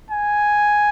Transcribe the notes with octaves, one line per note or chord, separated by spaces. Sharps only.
G#5